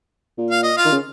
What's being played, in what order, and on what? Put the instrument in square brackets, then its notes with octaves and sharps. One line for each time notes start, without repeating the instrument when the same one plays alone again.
[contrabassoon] A#2
[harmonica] F5
D#5
F4 F5
[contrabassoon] D#3
C#3